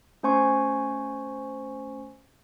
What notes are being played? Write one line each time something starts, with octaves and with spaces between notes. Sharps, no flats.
A3 C#4 C5 G#5 C6 C#6